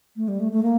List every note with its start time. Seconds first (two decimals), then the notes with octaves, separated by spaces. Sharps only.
0.17 A3
0.28 G3
0.40 A3
0.52 A3
0.63 A#3